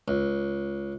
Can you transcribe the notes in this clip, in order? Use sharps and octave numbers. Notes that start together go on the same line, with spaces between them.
C#2